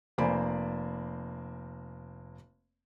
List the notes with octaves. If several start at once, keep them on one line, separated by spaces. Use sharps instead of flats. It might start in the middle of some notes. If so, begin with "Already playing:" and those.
F1 A#3 C5 D5 G#5 B5